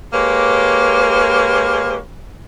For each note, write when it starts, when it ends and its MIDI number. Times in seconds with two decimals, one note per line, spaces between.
0.13 1.98 56
0.13 1.98 58
0.13 1.98 67
0.13 1.98 71
0.13 1.98 73